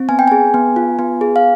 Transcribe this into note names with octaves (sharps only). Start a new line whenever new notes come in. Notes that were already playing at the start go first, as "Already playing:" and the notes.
Already playing: C4
B3 G#5
G5
G#4 G#5
B3
F4
B3
G#4
F5